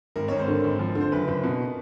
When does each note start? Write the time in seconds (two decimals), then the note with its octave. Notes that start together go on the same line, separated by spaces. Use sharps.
0.16 G#1 A#4
0.28 G#1 C#5
0.39 C5
0.48 D3
0.64 G#1
0.79 F3
0.95 D3
1.01 C5
1.12 F#1 B4
1.28 F#1
1.44 B2